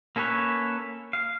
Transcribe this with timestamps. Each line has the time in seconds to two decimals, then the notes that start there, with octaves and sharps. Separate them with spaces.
0.16 A#3 C#4 A4 B4 C#5
1.13 F5